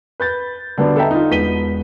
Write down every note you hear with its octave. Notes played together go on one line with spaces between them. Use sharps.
B4 G6 A6
D3 G3 B3 D4 F#4 D5
A4 B4 D#5 E5 G5 A#5
D#4 F4
E1 B3 B6 D#7 G7